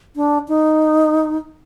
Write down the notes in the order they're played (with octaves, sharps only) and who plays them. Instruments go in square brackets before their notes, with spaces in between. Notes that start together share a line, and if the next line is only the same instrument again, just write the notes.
[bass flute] D4
D#4